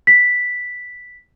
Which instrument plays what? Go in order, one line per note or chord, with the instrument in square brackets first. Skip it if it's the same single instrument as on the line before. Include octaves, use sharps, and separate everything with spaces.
[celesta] B6